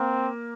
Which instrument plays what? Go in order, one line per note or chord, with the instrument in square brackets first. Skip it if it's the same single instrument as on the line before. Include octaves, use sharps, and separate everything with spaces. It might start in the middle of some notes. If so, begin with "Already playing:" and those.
Already playing: [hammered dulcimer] A#3 [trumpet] C4